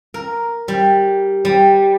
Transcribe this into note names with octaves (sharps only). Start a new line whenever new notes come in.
A#4
G3
G3